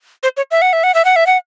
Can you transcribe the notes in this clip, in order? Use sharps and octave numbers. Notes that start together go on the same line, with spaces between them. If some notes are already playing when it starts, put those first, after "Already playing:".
C5
C#5
E5
F#5
E5
F#5
E5
F#5
E5
F#5